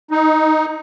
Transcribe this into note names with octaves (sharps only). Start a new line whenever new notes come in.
D#4